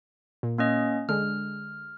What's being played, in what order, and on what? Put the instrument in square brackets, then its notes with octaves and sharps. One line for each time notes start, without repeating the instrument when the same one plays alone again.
[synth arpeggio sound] A#2
[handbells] A#3 C#4 D#5
[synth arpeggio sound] D3 G#3 [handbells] F6